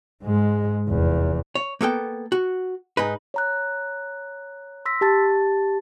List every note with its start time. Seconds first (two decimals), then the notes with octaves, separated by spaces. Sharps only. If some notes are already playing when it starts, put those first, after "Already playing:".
0.23 G#2 G#3
0.89 F1 E2
1.55 C#5
1.81 A#3 B3 A4 G5
2.32 F#4
2.97 G#2 D#4 B4
3.34 C#5 A#5 F#6
4.85 C6 E6 A#6 B6
5.01 G4 A5 A6